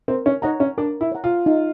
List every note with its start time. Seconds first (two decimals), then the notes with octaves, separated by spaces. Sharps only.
0.08 C4 A#4
0.26 C#4
0.42 D#4 C#5 F#5 A#5
0.60 C#4
0.78 D4 A#4
1.01 E4
1.12 C#5 F#5 A#5
1.24 F4
1.46 D#4